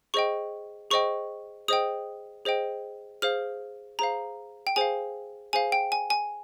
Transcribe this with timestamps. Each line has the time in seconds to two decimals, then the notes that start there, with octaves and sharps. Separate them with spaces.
0.14 G#4 C5 D#5 G5 C#6
0.91 G#4 C5 D#5 G5 C#6
1.68 G#4 C5 D#5 G5 D#6
2.45 G#4 C5 D#5 G5
3.22 G#4 C5 F5 F6
3.99 G#4 C5 F5 A#5
4.67 G5
4.76 G#4 C5 F5 G#5
5.53 G#4 C5 F5 G#5
5.72 G5
5.92 G#5
6.10 G#5